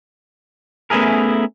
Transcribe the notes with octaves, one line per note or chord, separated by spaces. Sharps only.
A3 B3 C#4 E4 G#4 A#4